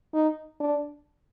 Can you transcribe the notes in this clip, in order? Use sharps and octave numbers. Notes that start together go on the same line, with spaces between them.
D#4
D4